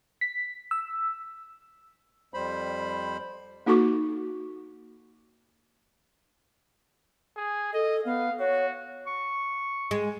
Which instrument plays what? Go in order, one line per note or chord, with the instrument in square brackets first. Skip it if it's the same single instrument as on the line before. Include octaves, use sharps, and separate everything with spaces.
[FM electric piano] B6
E6
[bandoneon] F2 G3 C5 B5
[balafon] A#3 D#4 F#4 A4 C#6 D6
[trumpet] G#4
[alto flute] A4 [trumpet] D#5
[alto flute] B3 [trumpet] F5
[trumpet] F#4 [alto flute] C#5
[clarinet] C#6
[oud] G#3